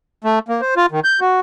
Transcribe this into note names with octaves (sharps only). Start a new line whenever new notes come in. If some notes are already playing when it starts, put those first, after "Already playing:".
A3
A#3
C5
F4
D#3
G6
F#4